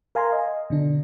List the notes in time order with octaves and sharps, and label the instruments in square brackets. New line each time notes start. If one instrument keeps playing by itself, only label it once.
[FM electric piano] A#4 F5 G#5 A#5 C6
D#5
B2 D3 D4